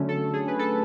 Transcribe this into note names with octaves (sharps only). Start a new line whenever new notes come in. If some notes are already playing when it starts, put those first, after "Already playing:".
Already playing: D3 F#3 A3 C#4
A4
G#4
B4
A4